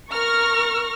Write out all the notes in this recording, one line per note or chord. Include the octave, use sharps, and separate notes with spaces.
A#4 C#6 F6 A#6